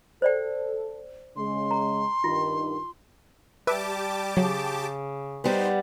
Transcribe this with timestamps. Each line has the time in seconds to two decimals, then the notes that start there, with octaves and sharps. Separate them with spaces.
0.22 A4 C5 D5 G5
1.36 C#3 G#3 C6
1.71 A#5
2.24 G2 D#3 F4
3.67 G3 G4 B4 E5 A5 D6
4.37 C#3 F#3
5.44 G3 B3 D#4 C5